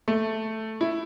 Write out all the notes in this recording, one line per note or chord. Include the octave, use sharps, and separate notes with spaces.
A3
E4